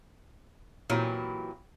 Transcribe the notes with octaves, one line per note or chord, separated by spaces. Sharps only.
A#2 E3 F#3 C4 E4 G4